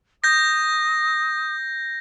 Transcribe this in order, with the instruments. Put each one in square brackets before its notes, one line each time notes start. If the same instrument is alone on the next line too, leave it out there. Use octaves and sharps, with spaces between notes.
[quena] D#6 [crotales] G6 A#6